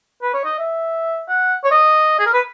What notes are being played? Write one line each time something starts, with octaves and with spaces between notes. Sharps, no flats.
B4
C#5
D#5
E5
F#5
C#5
D#5
G#4
A#4
B4